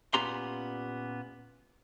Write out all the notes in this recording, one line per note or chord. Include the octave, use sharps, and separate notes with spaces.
A#2 B3 C#4 G4 A#5 C6